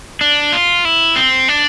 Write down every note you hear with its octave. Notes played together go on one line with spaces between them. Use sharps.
D4
F4
E4
C4
D4